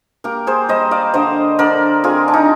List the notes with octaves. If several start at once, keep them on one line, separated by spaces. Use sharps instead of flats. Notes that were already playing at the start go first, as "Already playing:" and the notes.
A#3 G4 A#4
G#4 C5
G3 C5 D#5
D5 F5
D3 C5 D#5
D3 A#4 D5
C4 F4 G#4
D4
D#4